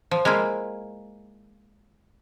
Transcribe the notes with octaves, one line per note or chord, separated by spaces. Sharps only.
F3
G#3 A#3 E4 F4